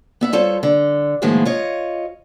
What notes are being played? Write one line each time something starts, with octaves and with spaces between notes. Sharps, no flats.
B3 E5 F#5
G3 F4 A4 C5 C#5
D3
A2 D#3 F3 G#3 A#3 B3
F4 C#5 D#5